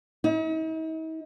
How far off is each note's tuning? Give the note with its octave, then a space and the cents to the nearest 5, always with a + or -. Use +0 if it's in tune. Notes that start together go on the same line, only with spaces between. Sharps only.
D#4 +45